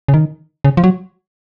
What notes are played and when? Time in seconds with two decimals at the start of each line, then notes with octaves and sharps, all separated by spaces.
0.08 C#3
0.14 D#3
0.64 C#3
0.77 F3
0.84 F#3